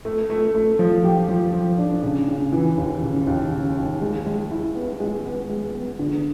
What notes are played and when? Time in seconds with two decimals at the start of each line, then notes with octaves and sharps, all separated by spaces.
0.05 A3
0.30 A3
0.55 A3
0.79 F3
1.04 G4
1.29 F3
1.53 F3
1.78 D4
2.03 C#3
2.28 C#3
2.52 E3
2.78 D#2
3.02 C#3
3.27 D#2
3.52 C#3
3.77 D#2
4.01 G#3
4.26 G#3
4.51 E4
4.75 B3
5.00 G#3
5.25 B3
5.49 G#3
5.74 B3
5.99 D3